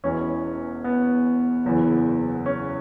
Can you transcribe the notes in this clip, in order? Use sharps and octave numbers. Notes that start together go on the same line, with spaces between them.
E1 E2 E3 C#4
B3
F#1 E2 E3
C#4